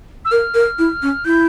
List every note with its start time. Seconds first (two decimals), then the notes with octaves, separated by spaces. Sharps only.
0.25 E6
0.31 A#4 F6
0.55 A#4
0.79 E4
1.02 C#4
1.25 E4 G6